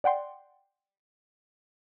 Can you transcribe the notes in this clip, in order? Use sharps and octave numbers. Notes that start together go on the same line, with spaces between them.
D5 F#5 G5 C6